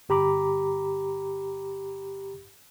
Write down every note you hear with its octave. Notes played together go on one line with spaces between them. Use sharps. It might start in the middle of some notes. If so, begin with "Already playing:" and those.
G1 G4 A#5 B5 D6